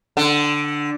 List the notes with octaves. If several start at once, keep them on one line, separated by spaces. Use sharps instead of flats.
D3